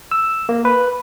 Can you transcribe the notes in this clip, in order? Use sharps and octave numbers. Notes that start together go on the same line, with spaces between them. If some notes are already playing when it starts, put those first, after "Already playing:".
E6
A#3
B4